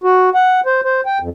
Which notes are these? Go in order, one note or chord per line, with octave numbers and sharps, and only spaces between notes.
F#4
F#5
C5
C5
G5
F2